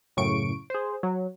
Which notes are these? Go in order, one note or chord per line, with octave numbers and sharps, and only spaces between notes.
F#2 A2 C#3 C#6 D7
G#4 C5
F#3